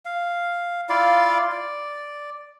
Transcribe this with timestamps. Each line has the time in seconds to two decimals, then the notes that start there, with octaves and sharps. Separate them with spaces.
0.05 F5
0.90 E4 F4 D5 F5
1.52 D5